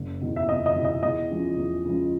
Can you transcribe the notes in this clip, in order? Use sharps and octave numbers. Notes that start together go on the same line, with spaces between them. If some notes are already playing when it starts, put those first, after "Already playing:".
Already playing: F#1
E2 B2
E5
F#1 D#5
D#5
E2 B2
D#5
E2 D#5
C#3 F3 G#3
E2
C#3 F3 G#3